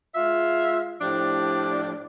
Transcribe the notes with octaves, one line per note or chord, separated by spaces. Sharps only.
G#3 F4 E5
A2 F3 D4 G4 D5